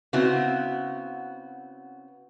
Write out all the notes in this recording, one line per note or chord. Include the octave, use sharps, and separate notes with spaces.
C#3 B3 C4 E4 F#4